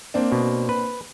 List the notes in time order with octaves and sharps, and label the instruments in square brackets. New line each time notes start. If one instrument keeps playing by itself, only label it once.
[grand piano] A#3 C4 D4
[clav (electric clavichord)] B2
B4